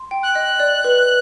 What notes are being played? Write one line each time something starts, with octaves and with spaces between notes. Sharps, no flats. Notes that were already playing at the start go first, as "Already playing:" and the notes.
Already playing: C6
G5
F#6
D#5
D5
B4